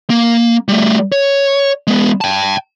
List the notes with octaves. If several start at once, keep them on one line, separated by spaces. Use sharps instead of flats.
A#3
G3 A3
C#5
G#3 B3
G5 A5